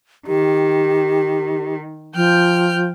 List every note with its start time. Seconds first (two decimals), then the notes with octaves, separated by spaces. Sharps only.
0.27 D#3 G4
2.15 F3 G5 F6 G6